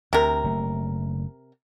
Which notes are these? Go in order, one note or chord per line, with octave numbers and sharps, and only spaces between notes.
D2 C3 A#4
F#1 A3